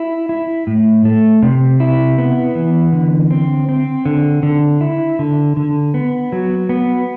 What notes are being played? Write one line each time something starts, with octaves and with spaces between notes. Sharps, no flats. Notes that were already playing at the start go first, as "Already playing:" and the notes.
Already playing: E4
E4
A2
A3
C3
E4
B3
E3
D3
C4
C4
D3
D3
E4
D3
D3
B3
F#3
B3